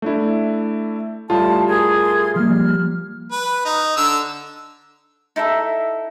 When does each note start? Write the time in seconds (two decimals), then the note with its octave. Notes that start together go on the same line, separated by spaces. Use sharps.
0.02 A3 D4 E4
1.30 A2 G3 F4 A5
1.69 G4 G#4 A#4 C6 G#6
2.36 F3 G3 A#3 F6
3.32 B4
3.65 D#4
3.97 D3 E6
5.36 D#4 E4 A4 E5